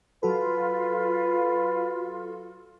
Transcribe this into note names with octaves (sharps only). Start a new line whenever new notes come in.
F#3 F4 F#4 A4 B4